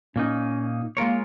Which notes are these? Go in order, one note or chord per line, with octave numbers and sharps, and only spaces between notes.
A#2 A#3 C#4 D#4
G#3 A#3 F4 A#4 C#5